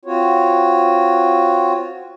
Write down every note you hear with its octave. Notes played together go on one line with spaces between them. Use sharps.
C4 F4 F#4 C#5